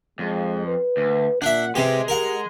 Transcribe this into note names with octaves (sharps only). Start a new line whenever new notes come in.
F2 G#3
B4
D2
A#2 D4 E5 F#5
C3 G#3 G4 G#4 B4
G4 A#4 F#5